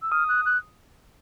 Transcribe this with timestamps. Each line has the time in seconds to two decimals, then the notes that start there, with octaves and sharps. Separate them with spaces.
0.02 E6
0.12 D#6 F6
0.29 F#6
0.46 F#6